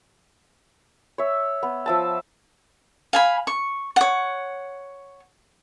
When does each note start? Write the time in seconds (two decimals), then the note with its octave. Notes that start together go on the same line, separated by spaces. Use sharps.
1.18 C#5 E5
1.63 B3
1.86 F3 E5 A5
3.13 F5 G#5 B5
3.47 C#6
3.96 C#5 F#5